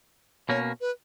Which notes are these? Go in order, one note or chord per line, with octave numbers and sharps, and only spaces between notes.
B2 A#3 C#4 C#5
B4